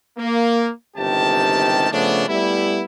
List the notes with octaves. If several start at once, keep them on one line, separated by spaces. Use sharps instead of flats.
A#3
G1 G#2 C3 D#3 G4 A5
C#3 F3 A3 B3 C#4 D4
G3 A3 B3 E4